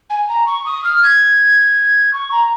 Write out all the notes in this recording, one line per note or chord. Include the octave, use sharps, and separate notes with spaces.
G#5
A#5
C#6
D#6
F6
G#6
C#6
A#5